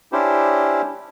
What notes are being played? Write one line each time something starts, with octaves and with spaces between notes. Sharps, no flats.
C#4 D4 E4 G4 C5